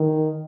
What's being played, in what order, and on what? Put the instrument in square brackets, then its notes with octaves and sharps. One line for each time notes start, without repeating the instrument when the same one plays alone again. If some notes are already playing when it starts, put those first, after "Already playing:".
Already playing: [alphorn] D#3